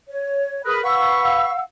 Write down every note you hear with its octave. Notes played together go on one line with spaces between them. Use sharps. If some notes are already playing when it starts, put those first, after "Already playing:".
C#5
G#4 A#4 B4 B5 D#6 F#6
B4 F5 F#5 B5 C#6 E6